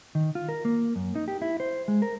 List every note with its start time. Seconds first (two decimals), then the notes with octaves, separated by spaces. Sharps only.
0.15 D#3
0.35 F4
0.49 A#4
0.65 A#3
0.96 F#2
1.15 D#4
1.28 G4
1.42 E4
1.60 C5
1.88 G#3
2.02 A#4